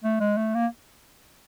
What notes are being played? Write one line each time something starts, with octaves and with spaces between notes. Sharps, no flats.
A3
G#3
A3
A#3